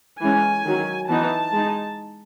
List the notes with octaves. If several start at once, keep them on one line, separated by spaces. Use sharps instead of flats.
E3 G#3 C#4 G#5
D#3 F#3 C#4
E3 B3 D#4 A5
G#3 D#4